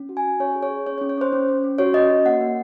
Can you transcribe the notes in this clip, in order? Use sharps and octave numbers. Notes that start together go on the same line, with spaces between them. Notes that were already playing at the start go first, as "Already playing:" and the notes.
Already playing: C#4
F#4
G#5
F#4
C#4 C#5
G#4
C#5
G#4
C#4 C#5
C#5
C#4
C#5
C#4 C5
C#4
C#4
C#4
F#4 C#5
C#4 D#5
F#4
A#3 F#5
A#3